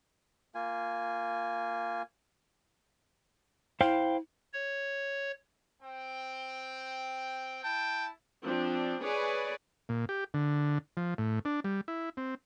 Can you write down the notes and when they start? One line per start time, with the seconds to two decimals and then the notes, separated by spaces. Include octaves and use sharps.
0.55 A#3 F4 G#5
3.81 E4 C5 F5 G5
4.53 C#5
5.81 C4 G5
7.63 E4 G5 A5
8.45 F3 C4 D4
9.02 G#4 B4 C#5 D5 G#5
9.89 A#2
10.09 G4
10.34 D3
10.97 F3
11.18 A2
11.45 D4
11.64 G3
11.88 E4
12.17 C4